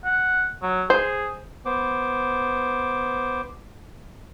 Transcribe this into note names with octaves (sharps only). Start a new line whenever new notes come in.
F#5
F#3
G#4 C5
B3 C5 D6